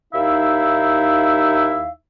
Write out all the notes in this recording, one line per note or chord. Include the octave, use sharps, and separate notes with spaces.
D#2 D#4 E4 E5 F5